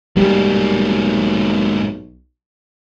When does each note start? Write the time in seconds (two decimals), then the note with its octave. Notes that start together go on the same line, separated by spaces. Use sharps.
0.17 B1 G#2 G3 A#3